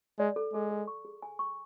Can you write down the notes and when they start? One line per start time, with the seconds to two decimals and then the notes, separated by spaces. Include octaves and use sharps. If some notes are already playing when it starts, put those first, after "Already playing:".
0.19 G#3 D5
0.36 A4
0.53 G#3 A4
0.71 A4
0.87 C#6
1.05 G#4
1.22 G#5
1.39 C#6